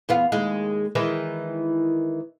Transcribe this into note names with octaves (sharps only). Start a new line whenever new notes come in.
E2 B3 F4
D#2 G#3
D#3 E3 G#3